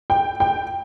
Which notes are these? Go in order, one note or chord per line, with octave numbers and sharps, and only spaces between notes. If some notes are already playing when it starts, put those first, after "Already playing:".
G5
G5